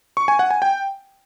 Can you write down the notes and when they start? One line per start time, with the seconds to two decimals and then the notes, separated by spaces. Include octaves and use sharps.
0.17 C#6
0.28 G#5
0.39 F#5
0.51 G#5
0.62 G5